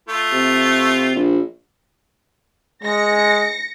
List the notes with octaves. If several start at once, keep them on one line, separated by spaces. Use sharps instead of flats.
A3 F4
C3
A#1
G#3 A#6 C#7